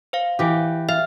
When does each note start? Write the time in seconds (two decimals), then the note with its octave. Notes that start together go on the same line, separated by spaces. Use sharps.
0.13 C5 F5
0.39 E3 G4
0.89 E5 F5